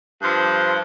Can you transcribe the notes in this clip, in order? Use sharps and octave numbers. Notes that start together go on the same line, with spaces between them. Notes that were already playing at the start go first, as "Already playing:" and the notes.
G2 F3